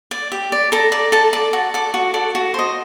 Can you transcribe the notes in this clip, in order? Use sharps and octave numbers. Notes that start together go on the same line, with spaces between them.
D5
G4
D5
A4 A#5
D5
A4 A5
D5
F#4
A4 D5
F#4
A4 D5
F#4
C5 D#5